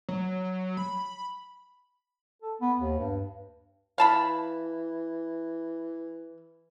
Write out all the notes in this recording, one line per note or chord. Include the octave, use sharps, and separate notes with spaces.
F#3
B5
A4
B3
D#2
G2
E3 F5 A5 B5